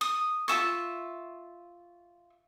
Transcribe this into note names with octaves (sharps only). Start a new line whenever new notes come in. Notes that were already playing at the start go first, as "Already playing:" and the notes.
D#6
F4 A4 E5 C#6